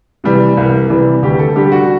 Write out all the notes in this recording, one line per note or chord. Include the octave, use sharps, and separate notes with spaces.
C3 E3 G3
C2
C3 E3 G3
D2 G4
A4
D3 G3 G4
F#4